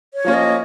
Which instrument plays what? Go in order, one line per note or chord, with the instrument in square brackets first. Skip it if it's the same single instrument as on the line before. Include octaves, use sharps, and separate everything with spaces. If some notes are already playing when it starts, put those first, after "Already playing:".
[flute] C#5
[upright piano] F3 A#3 C#4
[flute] D#5